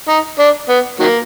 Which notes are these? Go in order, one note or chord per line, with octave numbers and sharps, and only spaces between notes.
D#4
D4
B3
D#3 F#3 A#3